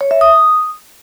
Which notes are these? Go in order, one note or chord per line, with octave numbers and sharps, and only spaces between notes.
C#5
E5
D#6